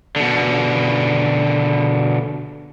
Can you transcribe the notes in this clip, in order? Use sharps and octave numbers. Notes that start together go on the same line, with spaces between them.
B2 D3